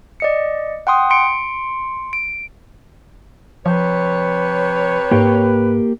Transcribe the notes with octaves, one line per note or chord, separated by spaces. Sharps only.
D5 D#5 C#7
F#5 G5 C6 D#6
C6 C#7 D7
D7
C3 F3 B4 C#5
G#2 A#3 G4